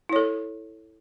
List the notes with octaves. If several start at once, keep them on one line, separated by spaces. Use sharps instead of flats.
E4 A4 C#5